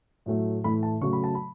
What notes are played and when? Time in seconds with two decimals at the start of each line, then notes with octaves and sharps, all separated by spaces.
0.26 A2 F#3 A3
0.64 A2 E3 A3 B5
0.83 A5
1.01 C#3 F#3 A3 C#6
1.13 B5
1.24 A5
1.35 B5